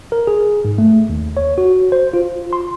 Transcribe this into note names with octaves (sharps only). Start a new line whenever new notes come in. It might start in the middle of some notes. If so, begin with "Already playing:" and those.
A#4
G#4
G#2
A3
D#2
C#5
F#4
C5
F4
C6